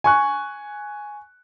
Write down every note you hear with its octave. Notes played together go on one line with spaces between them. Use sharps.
G#5 C#6 F#6